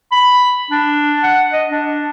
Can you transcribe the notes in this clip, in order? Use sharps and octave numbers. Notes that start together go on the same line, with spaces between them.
B5
D4
F#5
D#5
D4